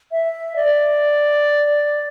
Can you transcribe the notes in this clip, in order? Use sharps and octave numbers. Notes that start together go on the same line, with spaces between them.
E5
D5